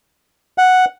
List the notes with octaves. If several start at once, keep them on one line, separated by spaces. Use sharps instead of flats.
F#5